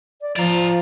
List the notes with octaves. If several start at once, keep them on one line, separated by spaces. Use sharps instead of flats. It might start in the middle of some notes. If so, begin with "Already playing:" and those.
D5
F3 D5 A#5